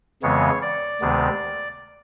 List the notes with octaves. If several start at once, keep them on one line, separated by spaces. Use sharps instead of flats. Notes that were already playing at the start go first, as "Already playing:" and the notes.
F2 C#3 E3 G#3 B3 C#5
D5
D2 C3 D#3 G#3 B3